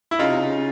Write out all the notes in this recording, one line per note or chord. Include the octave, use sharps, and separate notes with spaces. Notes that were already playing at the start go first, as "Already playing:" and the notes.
E4
C#3 D#4 F4
C3
C#3